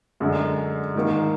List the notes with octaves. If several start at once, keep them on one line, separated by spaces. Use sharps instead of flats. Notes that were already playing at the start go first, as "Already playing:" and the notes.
F#2 D3 G#3 D4
G#2 D#3 A#3